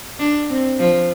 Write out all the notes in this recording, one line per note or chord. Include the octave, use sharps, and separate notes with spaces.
D4
C4
F3